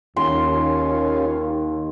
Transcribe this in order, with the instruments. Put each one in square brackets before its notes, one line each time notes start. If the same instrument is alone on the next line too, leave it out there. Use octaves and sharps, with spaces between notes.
[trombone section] D#2 [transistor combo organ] C#4 F4 [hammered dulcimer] C6